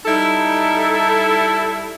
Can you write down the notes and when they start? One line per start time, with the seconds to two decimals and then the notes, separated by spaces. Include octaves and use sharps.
0.06 G3 D#4 E4 A4